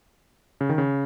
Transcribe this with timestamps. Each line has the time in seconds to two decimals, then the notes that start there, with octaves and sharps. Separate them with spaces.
0.61 C#3
0.70 D#3
0.78 C#3